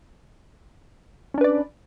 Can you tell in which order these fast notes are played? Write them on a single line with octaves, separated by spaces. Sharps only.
C#4 D4 B4 D5